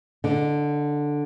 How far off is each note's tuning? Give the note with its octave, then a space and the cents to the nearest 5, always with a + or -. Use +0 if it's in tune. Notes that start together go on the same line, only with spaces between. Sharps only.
D3 +0 D#4 -25